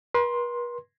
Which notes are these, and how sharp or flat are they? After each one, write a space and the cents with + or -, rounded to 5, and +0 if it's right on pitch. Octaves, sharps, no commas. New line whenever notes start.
B4 -45 C6 +10